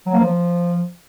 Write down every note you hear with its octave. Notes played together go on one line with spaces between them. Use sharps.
F#3
A#3
F3